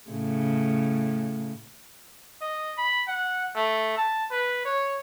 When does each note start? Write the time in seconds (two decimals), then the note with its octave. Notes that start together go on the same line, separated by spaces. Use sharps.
0.11 A2 C#3
2.41 D#5
2.78 B5
3.08 F#5
3.55 A3
3.97 A5
4.31 B4
4.65 C#5